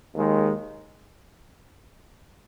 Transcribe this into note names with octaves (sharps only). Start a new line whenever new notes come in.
D#2 D#3 G#3